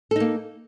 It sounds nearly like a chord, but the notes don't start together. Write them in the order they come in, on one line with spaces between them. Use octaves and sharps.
A4 D#4 A#3